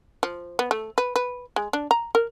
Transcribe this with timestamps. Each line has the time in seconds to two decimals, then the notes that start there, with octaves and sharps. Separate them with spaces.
0.23 F3
0.59 B3
0.71 A3
0.98 B4
1.16 B4
1.56 G#3
1.73 D4
1.91 A#5
2.15 A#4